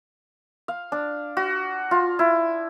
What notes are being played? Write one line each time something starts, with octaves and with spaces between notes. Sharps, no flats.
F5
D4
F#4
F4
E4